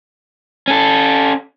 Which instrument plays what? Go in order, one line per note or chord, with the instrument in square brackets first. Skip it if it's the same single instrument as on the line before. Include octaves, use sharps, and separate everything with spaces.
[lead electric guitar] C#4 A4